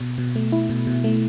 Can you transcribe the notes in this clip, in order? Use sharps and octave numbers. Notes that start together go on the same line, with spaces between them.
B2
B2
A3
E4
B2
B2
A3